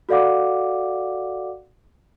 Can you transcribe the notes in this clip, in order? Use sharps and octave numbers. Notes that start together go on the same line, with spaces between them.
F#4 A4 D5 F5 F#5 D6